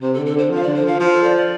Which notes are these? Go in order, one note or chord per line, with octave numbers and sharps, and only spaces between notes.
C3 C5
A4
D3
A4
D3 C5
F3
F5
D3 D5
C5
F3 F5
F3 C5
A4
D5
D5